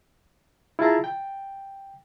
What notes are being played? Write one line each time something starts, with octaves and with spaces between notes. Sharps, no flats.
E4 F4 G#4 A5 A#5
G5